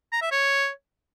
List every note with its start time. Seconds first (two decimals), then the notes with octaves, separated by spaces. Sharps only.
0.12 A#5
0.22 E5
0.31 C#5